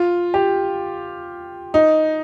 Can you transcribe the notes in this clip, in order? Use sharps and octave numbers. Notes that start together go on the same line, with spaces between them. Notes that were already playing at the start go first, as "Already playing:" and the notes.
Already playing: F4
G4
D#4